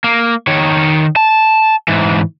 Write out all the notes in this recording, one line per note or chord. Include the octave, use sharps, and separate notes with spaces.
A#3
D#3 C#5
A5
G#2 E3